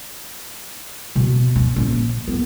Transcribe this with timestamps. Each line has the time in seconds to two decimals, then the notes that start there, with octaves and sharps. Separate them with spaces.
1.16 B2
1.56 C#4
1.76 A#1
2.28 B3